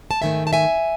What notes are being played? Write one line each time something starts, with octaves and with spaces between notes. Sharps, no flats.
A5
G#2 D#3 A3 E5 G#5
A5
E5 G#5